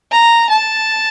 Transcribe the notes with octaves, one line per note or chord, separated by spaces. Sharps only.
A#5
A5